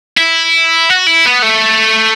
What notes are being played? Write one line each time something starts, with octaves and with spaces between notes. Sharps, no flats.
E4
F#4
E4
B3
A3